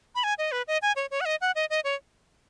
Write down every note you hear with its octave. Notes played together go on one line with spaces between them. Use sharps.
B5
G#5
D#5
B4
D#5
G#5
C#5
C#5
F#5
D#5
F#5
D#5
D#5
C#5